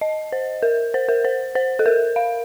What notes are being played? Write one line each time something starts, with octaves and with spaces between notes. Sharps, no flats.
D#5
C5
A#4
C5
A#4
C5
C5
A4
A#4
F5